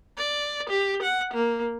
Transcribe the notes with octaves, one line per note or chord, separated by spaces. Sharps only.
D5
G4
F#5
A#3